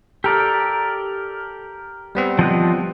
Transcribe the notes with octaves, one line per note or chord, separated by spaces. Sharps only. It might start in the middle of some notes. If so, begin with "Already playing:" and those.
G4 A4 A#4 D5
G3 B3 C4
F3 D#5 F#6